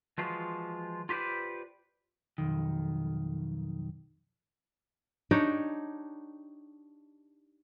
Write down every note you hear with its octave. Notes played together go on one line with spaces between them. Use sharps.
E3 F3 G#3 F4 F#4
F4 G4 B4 C5 D5
B1 F2 D#3
D4 D#4 G4 C#5